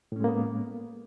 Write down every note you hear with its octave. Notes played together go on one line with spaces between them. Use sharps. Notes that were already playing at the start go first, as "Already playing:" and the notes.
A2 G#3 A#3 B3 C#4